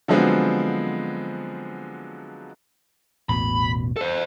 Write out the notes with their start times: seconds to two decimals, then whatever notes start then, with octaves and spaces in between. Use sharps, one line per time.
0.08 D3 F3 F#3 G#3 B3 C4
3.29 E1 A1 B2 B5
3.96 A4 C5